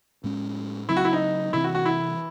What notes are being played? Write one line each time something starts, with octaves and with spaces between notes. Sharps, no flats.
A2 G#3 C#4
C#3 F#3 C4 E4
F#4
E4
D#4
C3 E3 C4 E4
F#4
F#4
E4